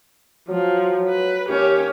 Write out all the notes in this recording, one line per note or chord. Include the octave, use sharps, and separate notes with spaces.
F3 F#3
B4
D#2 C#4 G4